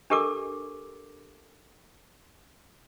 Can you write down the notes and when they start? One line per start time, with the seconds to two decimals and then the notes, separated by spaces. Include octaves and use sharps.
0.10 D4 G4 A4 A#4 D6